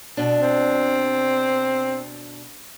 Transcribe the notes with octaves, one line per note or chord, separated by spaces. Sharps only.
B2 D4
C4